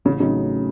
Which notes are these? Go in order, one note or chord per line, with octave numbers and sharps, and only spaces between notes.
A1 C#3
A2 C#3 F#3 C4 D#4